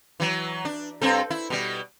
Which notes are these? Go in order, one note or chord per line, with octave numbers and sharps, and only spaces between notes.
E3 F#3
D4
G2 C4 A4
E4
B2 G3